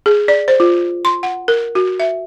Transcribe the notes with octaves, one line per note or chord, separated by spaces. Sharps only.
G#4
D5
C5
F4
C6
F#5
A#4
F#4
E5